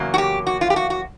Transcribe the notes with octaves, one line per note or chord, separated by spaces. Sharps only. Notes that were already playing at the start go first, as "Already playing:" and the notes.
Already playing: E2 C#3 F#3 A#3
F#4
G4
F#4
F4
G4
F#4
F#4